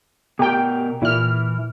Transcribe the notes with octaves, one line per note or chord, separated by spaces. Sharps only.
B2 G4 A#4 G5
A#2 E3 E4 F6